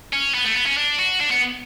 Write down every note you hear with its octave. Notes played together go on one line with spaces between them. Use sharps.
C#4
B3
A3
B3
C#4
D4
F#4
D4
B3